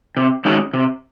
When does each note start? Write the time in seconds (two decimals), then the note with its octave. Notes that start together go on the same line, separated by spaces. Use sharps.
0.17 C3
0.45 D#3 G#3 C#4 F#4
0.74 C3